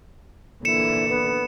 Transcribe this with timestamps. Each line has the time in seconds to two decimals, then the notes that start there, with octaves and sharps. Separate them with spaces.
0.65 A#2 D3 E3 E4 C#7 E7
1.09 B3